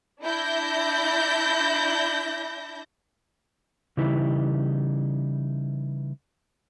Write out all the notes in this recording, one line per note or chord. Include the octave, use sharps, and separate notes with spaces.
D4 E4 G6 A#6
C#3 E3 G3 D#4 E4